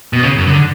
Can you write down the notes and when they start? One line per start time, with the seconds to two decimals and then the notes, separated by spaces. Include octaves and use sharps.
0.13 B2
0.23 C#3
0.38 F#2
0.46 C#3
0.52 D3